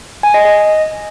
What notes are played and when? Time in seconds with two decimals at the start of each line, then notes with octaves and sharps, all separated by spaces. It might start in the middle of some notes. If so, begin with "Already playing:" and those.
0.23 G#5
0.34 D#5
0.45 D#5